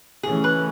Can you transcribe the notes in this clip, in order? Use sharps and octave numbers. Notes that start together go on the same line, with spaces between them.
C#3 E3 A3 C#4 G#4
B4